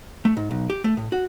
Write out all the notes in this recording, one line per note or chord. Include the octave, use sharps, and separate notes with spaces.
A3
G#2
B1
G4
A3
A2
F#4